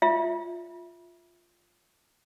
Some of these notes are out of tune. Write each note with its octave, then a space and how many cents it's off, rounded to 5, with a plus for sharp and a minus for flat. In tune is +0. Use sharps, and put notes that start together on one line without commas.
F4 +0 E5 +0